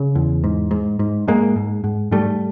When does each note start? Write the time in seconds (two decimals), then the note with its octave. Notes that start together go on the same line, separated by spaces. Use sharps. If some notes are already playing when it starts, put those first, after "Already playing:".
Already playing: C#3
0.15 E2
0.44 G#2
0.71 G#2
0.99 G#2
1.28 G#2 G#3 A#3
1.56 G#2
1.84 G#2
2.11 G#2 G3 A3